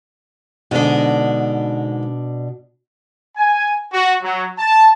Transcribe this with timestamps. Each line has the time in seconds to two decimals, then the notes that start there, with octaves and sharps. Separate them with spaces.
0.71 G#2 B2 D3 D4
3.37 G#5
3.93 F#4
4.23 F#3
4.58 A5